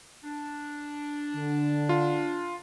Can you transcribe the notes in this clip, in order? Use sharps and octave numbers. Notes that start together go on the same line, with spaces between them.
D4
D3
F4